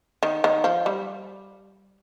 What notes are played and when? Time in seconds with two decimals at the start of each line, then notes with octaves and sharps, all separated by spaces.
0.23 D#3
0.44 D#3
0.64 F3
0.86 G3